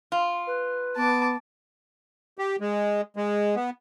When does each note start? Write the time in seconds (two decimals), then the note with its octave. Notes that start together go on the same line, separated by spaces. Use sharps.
0.12 F4
0.47 B4
0.96 B3 A5 D6
2.38 G4
2.60 G#3
3.16 G#3
3.56 B3